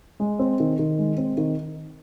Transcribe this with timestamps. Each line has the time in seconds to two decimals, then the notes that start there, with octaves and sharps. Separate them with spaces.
0.20 G#3
0.39 C4
0.60 D#3
0.79 D#3
0.98 G#3
1.18 C4
1.37 D#3